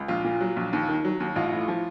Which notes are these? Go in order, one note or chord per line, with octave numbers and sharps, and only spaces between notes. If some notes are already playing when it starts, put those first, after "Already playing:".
Already playing: C#2
A#1 F4
A#2
F#3
A#1
D#2
D#3
F#3
D#2
A1 F4
A2
F3